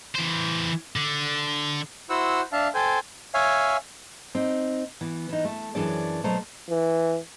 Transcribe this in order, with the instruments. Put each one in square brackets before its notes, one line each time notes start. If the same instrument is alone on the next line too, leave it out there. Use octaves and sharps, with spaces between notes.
[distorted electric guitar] E3 C5
D3
[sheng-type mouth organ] E4 F#4 C5 F#5 E6
D4 E5 F5 A5
A4 C5 G5 G#5
[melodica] C#5 E5 F5 G#5
[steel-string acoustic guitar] C4 D#4
E3 B3
E3 D#4
A3
F#2 E3 C#4 D4 G#4 D5
B2 F#3 A3 C5 A#5
[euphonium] E3